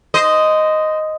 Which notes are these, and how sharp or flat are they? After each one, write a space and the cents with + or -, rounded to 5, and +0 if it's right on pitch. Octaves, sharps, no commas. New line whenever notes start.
C5 -20 D#5 +0